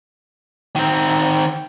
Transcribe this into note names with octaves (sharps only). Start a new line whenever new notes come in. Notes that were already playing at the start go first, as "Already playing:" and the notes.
D#3 C4